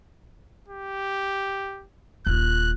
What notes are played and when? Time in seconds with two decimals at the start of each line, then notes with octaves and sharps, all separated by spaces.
0.69 G4
2.26 D#1 F4 F#6